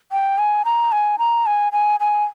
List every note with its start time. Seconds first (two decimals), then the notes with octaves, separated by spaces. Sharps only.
0.12 G5
0.38 G#5
0.65 A#5
0.92 G#5
1.19 A#5
1.46 G#5
1.72 G#5
2.00 G#5